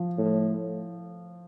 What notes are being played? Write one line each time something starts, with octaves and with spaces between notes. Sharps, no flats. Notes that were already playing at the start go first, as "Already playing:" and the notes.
Already playing: F3
A2